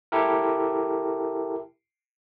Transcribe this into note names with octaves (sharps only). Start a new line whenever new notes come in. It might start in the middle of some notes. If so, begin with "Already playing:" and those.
E4 G4 A4 A#4